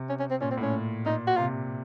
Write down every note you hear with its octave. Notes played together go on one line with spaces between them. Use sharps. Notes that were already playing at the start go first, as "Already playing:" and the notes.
Already playing: C3
C#4
C#4
C4
A#2 C#4
C4
A2
C#4
A#2 D#4
F#4
C3 F4